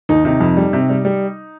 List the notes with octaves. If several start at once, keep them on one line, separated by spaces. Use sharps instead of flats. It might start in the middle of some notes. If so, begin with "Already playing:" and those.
D#2 D#4
C3 D#4
F2
G3
C3
G3
G3